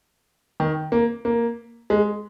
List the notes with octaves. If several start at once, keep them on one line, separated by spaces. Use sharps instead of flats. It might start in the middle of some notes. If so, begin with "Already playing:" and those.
D#3
A#3
A#3
G#3